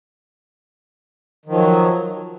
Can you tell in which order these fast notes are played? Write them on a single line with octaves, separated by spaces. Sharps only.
D#3 F3 F#3